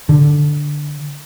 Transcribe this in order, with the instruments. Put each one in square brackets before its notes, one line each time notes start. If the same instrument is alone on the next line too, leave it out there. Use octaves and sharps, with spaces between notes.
[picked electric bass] D3